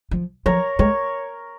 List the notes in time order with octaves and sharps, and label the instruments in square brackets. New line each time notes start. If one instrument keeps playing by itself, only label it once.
[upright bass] F3
[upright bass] F3 [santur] A#4 C#5
[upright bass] G#3 [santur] A#4 C#5